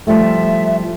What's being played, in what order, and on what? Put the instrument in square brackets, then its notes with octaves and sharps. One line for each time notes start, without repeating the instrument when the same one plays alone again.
[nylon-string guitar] F3 G3 A3 [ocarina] E5